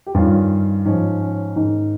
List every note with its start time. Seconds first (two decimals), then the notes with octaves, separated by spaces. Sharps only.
0.06 G4
0.15 G2 D#3 C#4 F4
0.85 G#2 F3 C#4
1.20 C#4
1.56 G#2 D#3